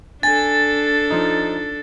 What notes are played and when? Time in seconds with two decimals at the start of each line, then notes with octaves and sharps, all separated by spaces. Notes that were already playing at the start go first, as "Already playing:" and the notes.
0.23 D4 A4 G#5 A6
1.10 F3 D#4